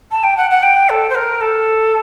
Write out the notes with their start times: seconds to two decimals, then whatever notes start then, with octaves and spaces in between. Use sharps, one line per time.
0.11 A5
0.23 G5
0.37 F#5
0.50 F#5
0.62 G5
0.89 A4
1.09 C5
1.14 A#4
1.40 A4